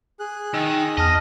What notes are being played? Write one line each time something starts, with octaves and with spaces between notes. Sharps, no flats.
G#4 F#6
D#3 E6
E2 D#5 G#5 A5 F6